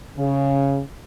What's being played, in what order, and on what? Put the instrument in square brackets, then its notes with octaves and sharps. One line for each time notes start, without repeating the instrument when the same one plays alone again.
[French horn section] C#3